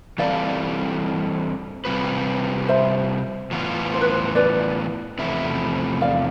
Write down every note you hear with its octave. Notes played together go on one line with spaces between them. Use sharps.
E3 G3 C4 E4 A4 D5 F5
C3 G3 C4 F4 B4
C5 E5
A2 E3 B3 F4
C5
B4
C5
B4 D5
E2 C3 F3 A3 E4
D5 F5